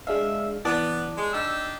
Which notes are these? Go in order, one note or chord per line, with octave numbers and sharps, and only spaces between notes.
G#3 D4 E5 F5
E3 B3 D5 A5
G#3
D4 D#4 G4 E6